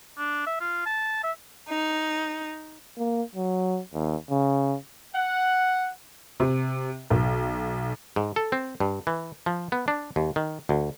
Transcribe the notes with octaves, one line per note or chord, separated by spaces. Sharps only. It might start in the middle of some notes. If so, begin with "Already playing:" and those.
D4
E5
F4
A5
E5
D#4
A#3
F#3
D#2
C#3
F#5
C3
B1
G#2
A4
C4
G2
E3
F3
B3
D4
D#2
D#3
D2